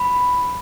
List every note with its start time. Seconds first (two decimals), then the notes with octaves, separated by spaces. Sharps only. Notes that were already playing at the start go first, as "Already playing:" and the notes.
Already playing: B5